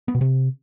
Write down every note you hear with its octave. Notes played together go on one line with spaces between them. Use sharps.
B3
B2
C3